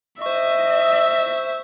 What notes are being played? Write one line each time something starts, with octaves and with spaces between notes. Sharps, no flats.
C5 D#5 E5 C#6